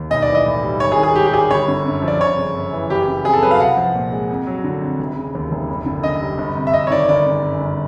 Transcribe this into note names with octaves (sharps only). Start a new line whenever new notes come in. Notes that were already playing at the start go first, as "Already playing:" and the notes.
Already playing: D#2
B1 D#5
D5
E3
D#5
A2
G3
G#1 C#5
G#4
D#3
G#4
G#2 G4
G4
G3 G#4
G1 C#5
D3
F#2
F3
D5
G1 C#5
C#3
F#2
E3
F#1 G4
C#3
F2 G#4
A4
F#3 B4
F5
C2 F#5
F3
A#2
G#3
F2
F#3
D3
F2
F1
C#3
D#2
F1
F#1
D3
F#2 D#5
G3
G1
C3
E5
F2 D#5
C#5
D#3 D5
G1 D5
C#3
F#2
G1